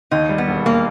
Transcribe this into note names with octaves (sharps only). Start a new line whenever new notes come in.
D#2 D#4
G3
B3
E1
A#3